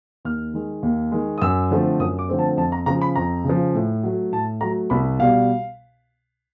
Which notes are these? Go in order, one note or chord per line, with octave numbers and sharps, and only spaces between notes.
D#2 F6
D#3 G#3
D#2
D#3 G#3
D#6
F#2 E6
D3 F3 A3 C4
F#2 D#6
D6
D3 F3 A3 C4
A5
F2 A5
A#5
C#3 F3 A#5
B5
F2 A#5
C#3
F3
A2
F#3 A3
A2 A5
F#3 A3 A#5
C2 B5
B2 G3 F5